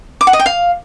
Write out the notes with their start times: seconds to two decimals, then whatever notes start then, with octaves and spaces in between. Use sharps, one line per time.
0.21 D6
0.27 F#5
0.33 D#5
0.39 G5
0.46 F5